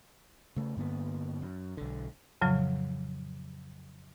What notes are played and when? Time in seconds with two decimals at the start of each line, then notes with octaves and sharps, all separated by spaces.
0.56 C#3 A3
0.77 G2 D3 A#3 B3
1.42 F#2
1.77 B1 D3
2.41 F2 A2 C#3 F3 F#3